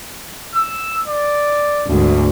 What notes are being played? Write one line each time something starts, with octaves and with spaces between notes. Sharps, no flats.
E6
D5
D2 G#2